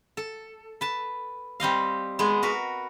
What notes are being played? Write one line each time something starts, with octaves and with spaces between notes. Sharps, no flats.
A4
B4 A5
G3 C4 D#5 F5
G#3 B3
F#4 A#4 B4